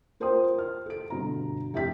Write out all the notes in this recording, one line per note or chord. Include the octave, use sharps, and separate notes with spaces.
F4 A#4 C5 G5 C6 D#6
F6
A4 D7
G1 B2 A#5
F1 G4 E5 G5 B6